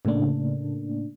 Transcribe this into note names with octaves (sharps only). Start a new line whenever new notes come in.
A2 C#3 A3 A#3 D4